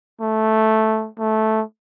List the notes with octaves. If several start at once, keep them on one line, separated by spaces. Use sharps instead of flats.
A3
A3